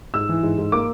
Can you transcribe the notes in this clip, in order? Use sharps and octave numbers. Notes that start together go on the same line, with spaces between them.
G#2 E6
E3
G#2
G#2
A#3 D6